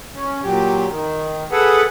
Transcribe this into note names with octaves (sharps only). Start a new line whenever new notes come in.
C#4
A#2 F#3 G4
D#3
G#4 A4 B4 F#5